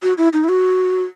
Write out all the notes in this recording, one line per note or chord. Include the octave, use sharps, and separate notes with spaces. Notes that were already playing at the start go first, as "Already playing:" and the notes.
F#4
E4
D#4
E4
F#4